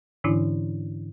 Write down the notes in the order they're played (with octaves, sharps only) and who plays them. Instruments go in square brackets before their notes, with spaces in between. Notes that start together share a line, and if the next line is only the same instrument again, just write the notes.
[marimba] G#2 D3 E3 C#4 D4 E4